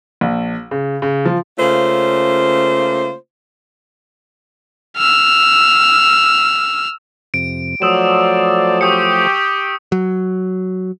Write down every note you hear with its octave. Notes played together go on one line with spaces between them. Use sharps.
A#1
C#3
C#3
F3
C#3 A3 A#3 C#4 F4 C5
E6 F6
F2 C3 D7
F3 F#3 A3 C5 D5 D#6 E6 E7
G4 C#6 D#6 C#7
F#3